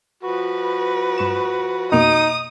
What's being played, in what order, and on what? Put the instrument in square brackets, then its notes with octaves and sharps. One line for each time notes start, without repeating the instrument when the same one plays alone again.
[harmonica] F3 F#4 [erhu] B4
[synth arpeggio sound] G2 C#6 E7
[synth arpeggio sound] F2 B2 A#3 [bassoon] D#4 [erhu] D#6